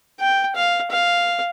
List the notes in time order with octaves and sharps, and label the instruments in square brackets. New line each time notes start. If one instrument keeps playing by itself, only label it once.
[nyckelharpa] G5
F5
F5